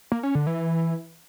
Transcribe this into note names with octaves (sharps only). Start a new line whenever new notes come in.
A#3
C#4
D3
E3